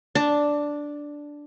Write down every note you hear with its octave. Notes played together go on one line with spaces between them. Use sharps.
D4